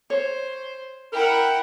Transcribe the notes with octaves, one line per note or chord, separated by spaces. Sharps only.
C5 C#5
E4 A#4 F#5 G5 A#5